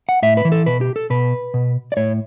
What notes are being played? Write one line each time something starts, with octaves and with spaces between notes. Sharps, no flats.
F#5
A2 E5
B4
E3
A4
B2 B4
G4
A4
B2 B4
B2
D5
A2 C#5